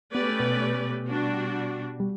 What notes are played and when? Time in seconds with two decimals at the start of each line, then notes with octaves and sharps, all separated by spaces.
0.15 A3 B3 C#4 G4 B4 D5
0.40 B2 B3
1.07 G3 D4 F#4
2.00 G3